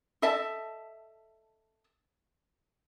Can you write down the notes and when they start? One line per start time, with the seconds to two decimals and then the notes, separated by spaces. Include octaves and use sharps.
0.22 A4 D#5 E5 A5